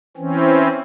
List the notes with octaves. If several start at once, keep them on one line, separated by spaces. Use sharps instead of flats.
E3 C4 C#4